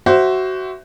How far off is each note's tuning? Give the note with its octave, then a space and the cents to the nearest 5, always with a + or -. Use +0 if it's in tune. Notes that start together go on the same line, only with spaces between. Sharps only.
F#4 +20 C5 +0 E5 +0